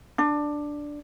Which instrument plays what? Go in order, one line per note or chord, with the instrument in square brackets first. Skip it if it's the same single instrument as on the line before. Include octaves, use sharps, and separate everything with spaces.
[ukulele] D4